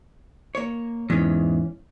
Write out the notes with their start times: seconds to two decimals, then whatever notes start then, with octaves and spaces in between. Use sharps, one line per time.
0.55 A#3 C#5
1.10 E2 G#2 E3 C#4